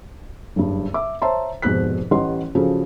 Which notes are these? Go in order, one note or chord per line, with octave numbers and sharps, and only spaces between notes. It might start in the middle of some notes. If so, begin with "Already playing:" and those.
F#1 G2
E5 D6
C5 C#5 E5 A5 A#5 C6
F1 G#2 B2 C5 F#6 B6
A1 G3 D#5 F#5 C6
C#3 F3 F#3 G#4 A4